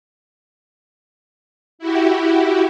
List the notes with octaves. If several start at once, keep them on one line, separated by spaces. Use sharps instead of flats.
E4 F#4 G4